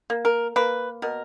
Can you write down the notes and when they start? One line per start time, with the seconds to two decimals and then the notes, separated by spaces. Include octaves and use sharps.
0.10 A#3
0.25 A#4
0.56 A#3 B4
1.02 B2 A#4